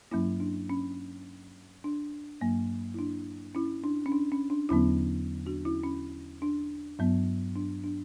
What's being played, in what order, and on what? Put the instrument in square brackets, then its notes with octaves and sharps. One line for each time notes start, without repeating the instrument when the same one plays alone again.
[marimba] G2 F#3 A#3 C#4 E4
D4
C#4
D4
G2 F#3 A#3
E4
D4
C#4 E4
D4
C#4
D4
C#4
D4
E2 D3 F#3 B3 C#4 E4
D4 F#4
C#4 E4
C#4
D4
G2 F#3 B3
D4
D4